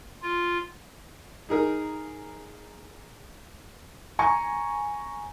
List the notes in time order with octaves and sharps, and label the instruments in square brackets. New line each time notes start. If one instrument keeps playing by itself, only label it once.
[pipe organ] F4
[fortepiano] D#4 G#4 A#4
[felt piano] G#5 A#5 C#6